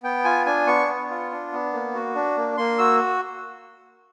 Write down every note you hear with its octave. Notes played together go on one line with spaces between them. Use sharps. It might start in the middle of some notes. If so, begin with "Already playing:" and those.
B3 G5
F4 G#5
D4 G#5
B3 C#6
B3
F4
D4
B3
A#3
F#4
D4
A#3
A#3 C6
F#4 E6